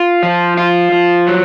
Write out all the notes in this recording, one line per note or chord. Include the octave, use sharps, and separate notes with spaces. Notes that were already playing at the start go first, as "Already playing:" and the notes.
Already playing: F4
F3
F4
F3
F#3